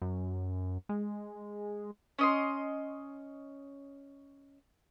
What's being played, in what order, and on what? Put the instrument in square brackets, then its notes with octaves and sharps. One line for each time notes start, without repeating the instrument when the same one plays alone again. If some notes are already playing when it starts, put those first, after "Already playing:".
[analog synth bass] F#2
G#3
[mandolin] C#4 D#5 C6